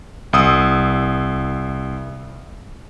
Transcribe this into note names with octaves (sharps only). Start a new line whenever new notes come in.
C2 D#6 E6